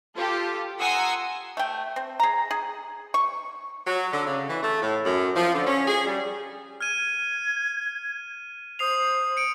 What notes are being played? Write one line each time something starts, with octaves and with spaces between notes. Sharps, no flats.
F4 G4 A4
F#5 G#5 A#5 C6 D#6 E6
A3 G5
C4
G#4 A#5
G#4
C#6
F#3
D3
C#3
E3
A3
A2
F#2
F3
D3
C#4
G#4
G3
F6 G#6 D#7
C5 D#6 C7 F7
C#7 D7